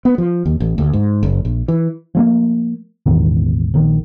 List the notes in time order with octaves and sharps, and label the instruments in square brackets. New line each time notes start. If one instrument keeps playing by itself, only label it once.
[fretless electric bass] B3
F3
D#2
A1
D2
G#2
F#1
A#1
E3
[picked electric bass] F3 A3 A#3
E1 A1 E2 D#3
A#1 D#3